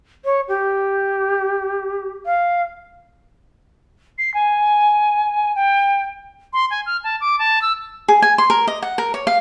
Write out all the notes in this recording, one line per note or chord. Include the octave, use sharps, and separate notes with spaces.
C#5
G4
F5
C7
G#5
G5
C6
G#5
F6
A5
D6
A5
E6
G#4
G#5
C6
A#4
D#5
F#5
A#4
C#5
F5